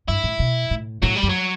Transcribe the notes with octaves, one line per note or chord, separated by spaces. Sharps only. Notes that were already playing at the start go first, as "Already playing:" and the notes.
G2 E4
A2
B2
A2
A2 F#3
G3
F#2
F#3